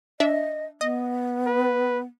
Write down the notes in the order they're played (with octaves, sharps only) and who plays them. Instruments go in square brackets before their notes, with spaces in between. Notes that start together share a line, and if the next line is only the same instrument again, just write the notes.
[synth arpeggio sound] D4 E5 [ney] D#5
[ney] B3 [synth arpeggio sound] D#5
[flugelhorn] B4